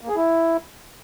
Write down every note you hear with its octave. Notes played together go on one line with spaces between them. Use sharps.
A#3
G#4
E4